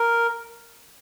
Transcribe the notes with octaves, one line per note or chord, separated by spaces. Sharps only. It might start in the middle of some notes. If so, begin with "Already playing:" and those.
Already playing: A#4